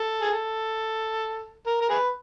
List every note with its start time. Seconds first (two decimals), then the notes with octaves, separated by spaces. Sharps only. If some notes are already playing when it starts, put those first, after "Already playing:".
Already playing: A4
0.21 G#4
0.31 A4
1.66 A#4
1.81 A#4
1.89 G#4 B4